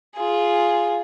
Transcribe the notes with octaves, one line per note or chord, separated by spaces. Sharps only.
F4 G#4